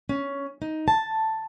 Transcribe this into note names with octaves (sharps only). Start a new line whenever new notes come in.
C#4
D#4
A5